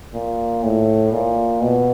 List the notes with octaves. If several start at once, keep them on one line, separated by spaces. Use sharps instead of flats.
A#2
A2
A#2
B2